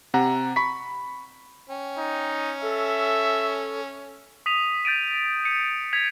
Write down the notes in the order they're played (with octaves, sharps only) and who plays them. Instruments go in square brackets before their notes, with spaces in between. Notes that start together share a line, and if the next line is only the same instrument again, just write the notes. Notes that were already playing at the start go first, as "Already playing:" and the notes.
[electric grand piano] C3 F#5 A#5
B5 C#6 B6
[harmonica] C#4 [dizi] G5
[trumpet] D#4
[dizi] A4 [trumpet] E5
[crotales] D#6 B6 D#7 F7
G6 A6 D7 D#7
C#7 D#7
G#6 B6 F7